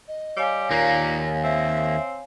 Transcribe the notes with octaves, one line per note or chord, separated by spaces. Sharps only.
D#5
G3 C#5 F5 G#5
D#2 A#2 A#3 A#5
C4 E5